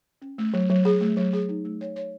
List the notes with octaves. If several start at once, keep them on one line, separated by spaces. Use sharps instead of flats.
C#4
A3
F#3
F#3
G#4
A3
F#3
G#4
D#4
A3
C#5
C#5